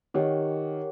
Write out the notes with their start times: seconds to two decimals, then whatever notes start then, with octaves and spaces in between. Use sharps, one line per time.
0.14 D#3 G4 A#4 C#5 F#5